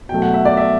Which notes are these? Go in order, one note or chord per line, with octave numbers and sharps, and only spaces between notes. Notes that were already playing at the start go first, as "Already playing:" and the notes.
B2 F#3 A3 G5
F#5
E5
D5
E5